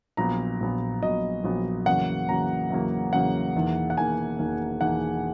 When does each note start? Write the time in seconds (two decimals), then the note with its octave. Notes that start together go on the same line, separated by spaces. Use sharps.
0.17 A#1 A#2 F#3 B3 A#5
0.60 A#1 A#2 F#3 B3
1.02 A#1 A#2 F#3 B3 D#5
1.44 A#1 A#2 F#3 B3
1.86 E2 C#3 F#3 A#3 F#5
2.28 E2 C#3 F#3 A#3 A#5
2.70 E2 C#3 F#3 A#3
3.13 E2 C#3 F#3 A#3 F#5
3.55 E1 E2 D#3 A#3
3.90 F#5
3.97 E1 E2 D#3 A#3 G#5
4.39 E1 E2 D#3 A#3
4.81 E1 E2 D#3 A#3 F#5